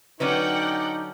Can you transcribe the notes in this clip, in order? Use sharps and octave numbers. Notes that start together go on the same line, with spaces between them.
D3 F#3 C#4 D#4 B4 D5 F#5 G5